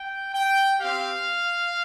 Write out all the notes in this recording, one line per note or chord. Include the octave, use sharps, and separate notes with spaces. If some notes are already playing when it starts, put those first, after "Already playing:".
Already playing: G5
G5
C4 G4 F5